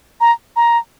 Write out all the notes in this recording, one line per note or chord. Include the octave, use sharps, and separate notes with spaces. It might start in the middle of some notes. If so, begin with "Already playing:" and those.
A#5
A#5